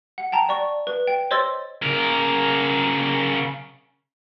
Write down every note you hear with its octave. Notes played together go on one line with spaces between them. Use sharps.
F#5
G5 A5 A#5
D5 C#6
B4
G5
C5 C#5 D#5 C6 E6 A6
C#3 A#4